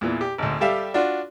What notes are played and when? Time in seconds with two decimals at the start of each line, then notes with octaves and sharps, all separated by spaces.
0.01 E2 A#2 E3
0.21 G4
0.38 G#1 D2
0.61 G3 G4 A4 E5 F5
0.94 D4 F4 F#4